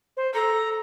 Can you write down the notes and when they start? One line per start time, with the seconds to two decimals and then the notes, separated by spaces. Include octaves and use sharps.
0.17 C5
0.34 A4 A#5